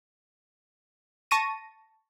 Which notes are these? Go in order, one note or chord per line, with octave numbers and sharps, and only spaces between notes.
A5 C#6 A#6 D#7